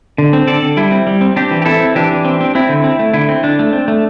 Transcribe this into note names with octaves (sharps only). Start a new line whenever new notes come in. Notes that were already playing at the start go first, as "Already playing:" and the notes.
D3
C4
D3 A4 D5
D3
G3 E4
C4
G3
C4
C4 D4 G4
E3
G4
C4 E4 A4
C4
E3 D4 G4
E3
C4
C4
C4 E4
D3
C4
A3
D3 E4
C4
D3 D4
A3
C4
A3